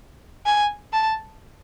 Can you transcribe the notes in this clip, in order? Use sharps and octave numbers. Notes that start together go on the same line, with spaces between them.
G#5
A5